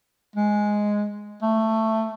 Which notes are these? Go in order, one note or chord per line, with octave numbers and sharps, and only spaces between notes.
G#3
A3